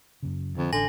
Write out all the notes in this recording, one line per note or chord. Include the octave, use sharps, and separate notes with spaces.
F#2 C#3
F2 D3
A1 D3 G#5 A#6 F#7